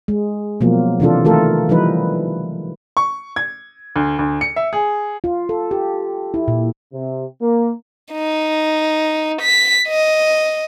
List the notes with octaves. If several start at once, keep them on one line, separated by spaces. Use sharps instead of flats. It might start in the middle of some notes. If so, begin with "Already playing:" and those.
G#3
B2 F3 F#3 A#3
C3 E3 D4 F4 A4
D#3 E3 A3 F4 A4 A#4
E3 F3 G3 D#4 B4
C#6
G#6
D2
D2
C#7
E5
G#4
F4
A4
G4
E4
A#2
C3
A#3
D#4
B6
D#5